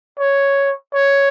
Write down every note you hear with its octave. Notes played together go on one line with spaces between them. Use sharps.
C#5
C#5